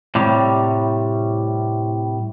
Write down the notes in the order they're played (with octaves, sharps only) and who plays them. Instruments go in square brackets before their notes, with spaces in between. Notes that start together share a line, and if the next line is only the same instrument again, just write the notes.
[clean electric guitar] A2 C3 G3